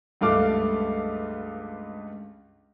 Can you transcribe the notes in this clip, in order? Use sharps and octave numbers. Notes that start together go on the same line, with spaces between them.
C#2 G2 A3 F5 D6